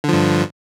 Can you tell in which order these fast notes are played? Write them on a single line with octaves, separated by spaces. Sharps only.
D3 F3 G2